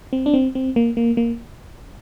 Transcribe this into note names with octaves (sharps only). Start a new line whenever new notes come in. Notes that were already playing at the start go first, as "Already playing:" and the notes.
C4
D4
C4
C4
A#3
A#3
A#3